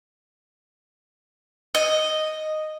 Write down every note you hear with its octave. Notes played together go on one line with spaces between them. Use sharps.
D#5